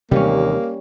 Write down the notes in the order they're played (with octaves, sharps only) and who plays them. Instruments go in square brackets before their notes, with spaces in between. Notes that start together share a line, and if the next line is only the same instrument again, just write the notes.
[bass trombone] D#2 [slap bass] C3 E3 G#3 [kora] G3 C#4 [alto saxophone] A#3